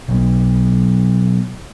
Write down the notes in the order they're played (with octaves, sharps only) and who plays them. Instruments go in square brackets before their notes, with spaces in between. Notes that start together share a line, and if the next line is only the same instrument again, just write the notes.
[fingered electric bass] B2 F#3 B3